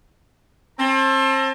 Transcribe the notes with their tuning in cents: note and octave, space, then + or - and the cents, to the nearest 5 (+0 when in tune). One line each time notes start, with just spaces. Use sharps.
C4 +35 A5 +0